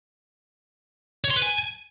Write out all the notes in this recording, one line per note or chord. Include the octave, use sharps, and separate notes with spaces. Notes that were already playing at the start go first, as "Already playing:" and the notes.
C#5
C6
B4
G#5